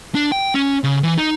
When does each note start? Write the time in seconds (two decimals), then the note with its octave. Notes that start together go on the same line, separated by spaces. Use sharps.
0.15 D4
0.32 G5
0.54 C#4
0.84 C#3
1.03 E3
1.18 D#4